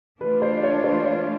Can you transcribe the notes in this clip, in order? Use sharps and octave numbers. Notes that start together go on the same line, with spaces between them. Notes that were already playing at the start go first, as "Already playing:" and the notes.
E3 A3 D4 F4 B4
C5
C#5
C5
C#5